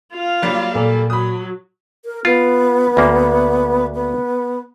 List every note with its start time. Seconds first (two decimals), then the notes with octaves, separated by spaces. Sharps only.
0.13 F4 F5
0.42 F#3 G3 A#3
0.75 A#2 A4
1.10 F#3 B5 D#6
2.05 A#4
2.25 B3 F4
2.97 D2 A#3
3.95 B3